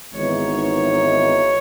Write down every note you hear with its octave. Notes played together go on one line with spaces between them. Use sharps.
G#1 G#2 E3 B3 D#4 C#5
C#5